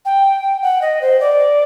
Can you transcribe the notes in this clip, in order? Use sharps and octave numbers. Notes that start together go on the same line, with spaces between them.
G5
F#5
D#5
C5
D5